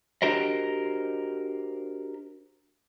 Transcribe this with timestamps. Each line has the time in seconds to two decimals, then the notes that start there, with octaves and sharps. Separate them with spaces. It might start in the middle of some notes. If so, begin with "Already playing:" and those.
0.22 D4 F#4 G4 A#4 C5 D#5